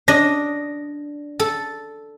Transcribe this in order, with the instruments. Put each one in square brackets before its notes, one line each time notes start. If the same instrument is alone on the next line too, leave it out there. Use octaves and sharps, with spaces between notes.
[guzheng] D4 D#5 [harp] A#6
[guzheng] A4